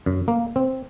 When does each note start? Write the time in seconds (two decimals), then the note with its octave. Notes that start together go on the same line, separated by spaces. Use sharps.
0.06 F#2
0.28 A#3
0.56 C4